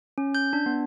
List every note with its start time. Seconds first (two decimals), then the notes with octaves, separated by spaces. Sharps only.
0.18 C#4
0.35 G6
0.53 D4
0.66 B3